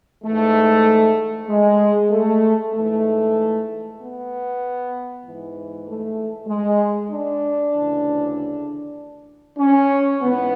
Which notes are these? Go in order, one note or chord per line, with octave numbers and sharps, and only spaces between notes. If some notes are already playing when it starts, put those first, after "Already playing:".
G#2 E3 A3
G#3
A3
G#2 E3 A3
B3
G#2 E3
A3
G#3
D4
D2 C#3 E3
C#4
G#2 E3 B3